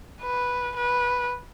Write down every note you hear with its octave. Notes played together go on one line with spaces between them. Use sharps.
B4
B4